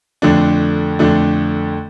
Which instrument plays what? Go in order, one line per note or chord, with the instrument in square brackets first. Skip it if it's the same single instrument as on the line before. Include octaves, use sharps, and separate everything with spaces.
[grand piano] F2 D3 A3 D4
F2 D3 A3 D4